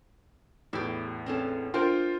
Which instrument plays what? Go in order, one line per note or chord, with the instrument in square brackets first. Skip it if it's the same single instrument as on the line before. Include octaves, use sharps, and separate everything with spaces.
[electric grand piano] E2 A2 [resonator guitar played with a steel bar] E4 G4
[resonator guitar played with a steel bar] C4 C#4 A4
[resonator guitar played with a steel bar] D4 A#4 G5 [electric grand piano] F4 C5